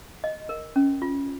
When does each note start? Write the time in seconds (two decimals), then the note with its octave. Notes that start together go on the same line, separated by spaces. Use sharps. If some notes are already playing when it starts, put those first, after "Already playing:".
0.24 D#5
0.49 A#4
0.76 C#4
1.02 F4